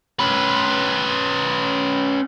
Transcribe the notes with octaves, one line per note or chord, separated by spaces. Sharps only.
C#4 B4